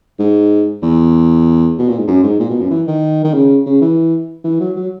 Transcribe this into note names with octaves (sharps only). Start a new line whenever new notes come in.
G#2
E2
B2
A#2
G#2
F#2
G#2
A#2
B2
F#2
E3
D#3
D#3
C#3
C#3
E3
E3
F#3
F#3